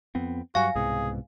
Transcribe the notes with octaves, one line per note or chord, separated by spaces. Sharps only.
F2 B3 C4
G2 F#3 F#4 F5 G#5
C2 G#2 B2 G#4